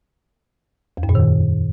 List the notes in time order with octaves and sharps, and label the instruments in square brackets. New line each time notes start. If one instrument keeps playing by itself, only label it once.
[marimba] E2
F#2
A#2
D#3